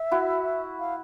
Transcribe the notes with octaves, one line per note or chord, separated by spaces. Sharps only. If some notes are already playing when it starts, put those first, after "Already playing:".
Already playing: E5
E4 F#4
F5